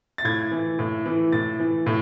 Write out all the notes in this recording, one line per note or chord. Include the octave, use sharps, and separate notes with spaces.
A6
A2 G#6
E3
A2
E3
A2 A6
E3
A2